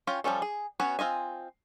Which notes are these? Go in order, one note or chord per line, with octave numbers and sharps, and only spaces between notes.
C#4 F4 G5
F3 G3 G#3 C#4 A4
G#4
B3 C#4 F#4 C#5
C4 F4 D#5 G#5